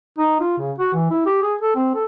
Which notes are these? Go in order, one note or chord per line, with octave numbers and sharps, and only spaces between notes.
D#4
F4
C#3
F#4
E3
E4
G4
G#4
A4
C4
A4